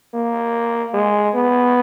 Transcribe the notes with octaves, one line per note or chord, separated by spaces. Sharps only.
A#3
G#3
B3